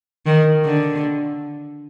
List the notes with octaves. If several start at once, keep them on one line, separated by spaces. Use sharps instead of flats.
D#3
D3